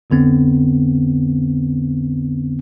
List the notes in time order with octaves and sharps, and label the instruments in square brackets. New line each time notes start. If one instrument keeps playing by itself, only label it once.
[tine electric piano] B1 F2 D3 B3 C4